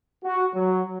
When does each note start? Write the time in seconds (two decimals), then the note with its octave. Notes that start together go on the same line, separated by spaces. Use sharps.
0.24 F#4
0.54 F#3